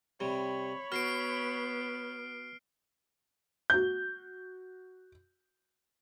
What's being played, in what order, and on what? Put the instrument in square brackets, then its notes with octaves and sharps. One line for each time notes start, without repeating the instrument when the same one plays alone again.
[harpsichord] C3 G3 [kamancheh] C#5 B5
[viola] B3 [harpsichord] F#4 [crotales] F6 C7 D7
[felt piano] F#4 G6